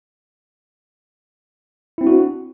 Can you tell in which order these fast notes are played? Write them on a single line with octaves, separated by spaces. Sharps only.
E4 C4 D4 F#4